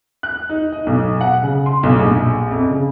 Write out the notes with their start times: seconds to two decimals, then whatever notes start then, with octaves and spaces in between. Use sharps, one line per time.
0.23 F#6
0.50 D#4
0.72 D#5
0.87 B1
1.21 F#5
1.42 C#3
1.66 C6
1.83 B1
1.99 A#1
2.51 F2
2.69 C#3